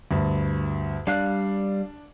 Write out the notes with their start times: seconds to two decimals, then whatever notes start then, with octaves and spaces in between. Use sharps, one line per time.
0.11 D2 G2
1.07 G3 D4 F5 F#6